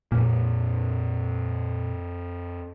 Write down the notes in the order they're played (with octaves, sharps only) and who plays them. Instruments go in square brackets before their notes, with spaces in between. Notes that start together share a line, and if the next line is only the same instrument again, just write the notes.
[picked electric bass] F2 A#3 [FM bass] A#2